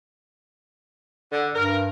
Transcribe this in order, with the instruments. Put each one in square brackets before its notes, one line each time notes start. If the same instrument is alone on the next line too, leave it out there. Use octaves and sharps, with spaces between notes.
[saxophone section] D3
[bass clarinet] G2 [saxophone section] A#4